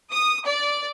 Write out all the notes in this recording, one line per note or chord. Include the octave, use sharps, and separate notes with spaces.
D#6
D5